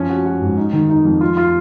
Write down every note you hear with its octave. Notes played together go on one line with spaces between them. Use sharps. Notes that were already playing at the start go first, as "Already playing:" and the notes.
Already playing: F3 C#4
F#4
F#4
G#2
D#4
D#3
D#4
F2
F4
F4